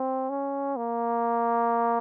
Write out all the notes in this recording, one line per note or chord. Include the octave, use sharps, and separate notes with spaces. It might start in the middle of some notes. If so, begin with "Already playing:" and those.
Already playing: C4
C#4
A#3